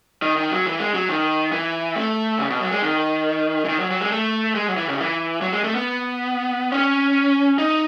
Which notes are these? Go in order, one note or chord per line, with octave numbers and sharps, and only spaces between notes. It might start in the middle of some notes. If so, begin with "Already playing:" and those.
D#3
D#3
F#3
E3
G#3
F#3
D#3
E3
A3
C#3
B2
F#3
G#3
D#3
E3
D#3
F#3
F#3
G#3
A3
G#3
F#3
E3
C#3
D#3
E3
F#3
G#3
A3
B3
C#4
D#4